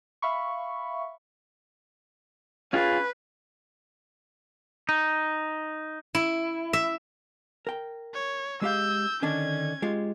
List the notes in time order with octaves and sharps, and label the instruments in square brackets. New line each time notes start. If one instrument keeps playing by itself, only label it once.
[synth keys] E5 F5 B5 C#6
[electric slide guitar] C#4 F4 G#4 [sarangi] B4
[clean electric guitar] D#4
[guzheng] E4
E5
[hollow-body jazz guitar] A#4 G5
[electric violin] C#5
[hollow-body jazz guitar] G#3 G4 F5 [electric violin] E6 G6
[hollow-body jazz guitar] D3 D#3 D4 [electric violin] C#4 G#6
[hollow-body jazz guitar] G#3 F4 G4